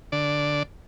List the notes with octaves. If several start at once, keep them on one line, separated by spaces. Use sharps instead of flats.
D3 D5